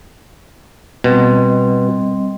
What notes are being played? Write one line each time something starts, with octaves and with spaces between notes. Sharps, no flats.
B2 G3 C4 D#5